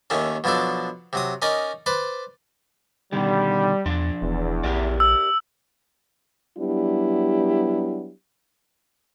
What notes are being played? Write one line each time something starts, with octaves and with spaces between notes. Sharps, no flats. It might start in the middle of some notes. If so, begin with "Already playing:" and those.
D#2 D#3 A3 C#4
B2 F3 F#3 D4 A4
C3 F#3 D#6
C#4 D#4 A#4 D5 D#5
B4 C5 D5
B2 D3 D#3 G3
E2 F3 D4 D5
E1 E2
A#1 G4 A#4 D5
E6
F#3 G3 B3 D4 E4 G4